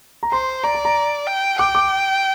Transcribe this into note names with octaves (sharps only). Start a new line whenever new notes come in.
A#5
C5 C6
D5 A#5
A#5
A#5
G5
G5 D6
D6